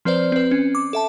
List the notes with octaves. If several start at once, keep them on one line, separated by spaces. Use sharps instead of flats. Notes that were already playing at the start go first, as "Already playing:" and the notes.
F3 C4 B4 C5 D5
C4 B4
C#4
D6
A4 E5 A5